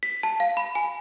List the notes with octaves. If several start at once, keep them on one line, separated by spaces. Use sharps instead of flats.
B6
A5
F5
B5
G#5